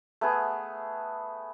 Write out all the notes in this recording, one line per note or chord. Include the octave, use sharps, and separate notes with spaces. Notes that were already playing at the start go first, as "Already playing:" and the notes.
A3 B3 G#4